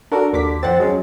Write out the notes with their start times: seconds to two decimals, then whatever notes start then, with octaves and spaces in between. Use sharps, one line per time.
0.12 D4 F#4 A4 A#4
0.33 D#2 D3 D6 B6
0.63 F2 C4 F#5 A6
0.80 F#3 G#3 C#4